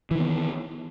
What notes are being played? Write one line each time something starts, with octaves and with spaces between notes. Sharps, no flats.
D#3 E3 B3